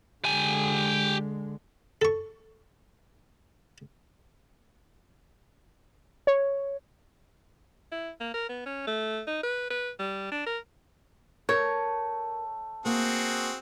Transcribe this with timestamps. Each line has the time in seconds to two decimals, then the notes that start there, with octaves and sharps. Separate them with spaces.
0.24 D3 G#3 G4 G#5
2.02 A4 C#6
6.27 C#5
7.92 E4
8.20 A#3
8.34 A#4
8.49 B3
8.66 C#4
8.87 A3
9.27 D#4
9.44 B4
9.71 B4
9.99 G3
10.32 D4
10.47 A#4
11.49 A3 A#4 C#5
12.85 A#3 C4 F#4 G#4